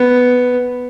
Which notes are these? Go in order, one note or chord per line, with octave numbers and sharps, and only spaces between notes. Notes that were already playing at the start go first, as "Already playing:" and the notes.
Already playing: B3